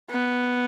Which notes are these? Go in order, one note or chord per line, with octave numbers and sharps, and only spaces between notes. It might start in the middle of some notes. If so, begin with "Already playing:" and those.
B3